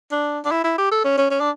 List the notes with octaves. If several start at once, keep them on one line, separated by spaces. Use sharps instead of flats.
D4
D4
E4
E4
G4
A4
C#4
C#4
C#4
D4